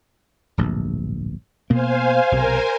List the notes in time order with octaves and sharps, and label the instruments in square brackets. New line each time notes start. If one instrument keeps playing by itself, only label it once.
[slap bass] D1 A#1 G2
[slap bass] B2 A#3 [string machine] C5 F5 G#5
[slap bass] B1 C3 [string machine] A#4 C5 G#5